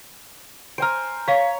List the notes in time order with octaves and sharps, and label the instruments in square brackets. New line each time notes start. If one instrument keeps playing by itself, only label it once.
[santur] C5 G#5 A#5 [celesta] F6 D7
[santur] C#5 [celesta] F5 B6